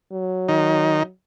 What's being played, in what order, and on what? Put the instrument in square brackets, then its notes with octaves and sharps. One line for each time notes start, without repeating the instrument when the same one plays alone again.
[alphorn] F#3
[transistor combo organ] D#3